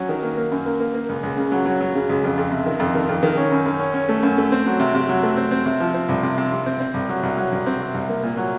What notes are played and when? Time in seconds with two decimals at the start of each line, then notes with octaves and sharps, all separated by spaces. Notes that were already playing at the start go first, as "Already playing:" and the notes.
Already playing: F#3 C#4
0.09 D#3
0.23 A#3
0.37 A#3
0.52 F#2
0.66 A#3
0.80 A#3
0.94 A#3
1.09 C#2
1.23 C#2
1.37 C#3
1.52 F#3
1.65 F#3
1.80 F#3
1.95 C#3
2.09 C#2
2.24 F2
2.37 F2
2.51 C3
2.66 D#3
2.80 F2
2.95 D#3
3.09 F2
3.23 D#3
3.37 C#4
3.52 F#2
3.66 F#2
3.80 C#4
3.94 C#4
4.09 A3
4.23 F#2
4.38 A3
4.52 C4
4.66 F#3
4.80 C3
4.95 C3
5.09 F#3
5.23 A3
5.37 C4
5.51 C4
5.66 C3
5.80 F3
5.94 C4
6.09 C2
6.23 C3
6.38 C3
6.52 C3
6.66 C4
6.80 C4
6.94 C2
7.09 F#3
7.23 C2
7.37 F#3
7.52 C2
7.66 C4
7.80 C3
7.94 C2
8.09 A#3
8.23 A#2
8.37 F#3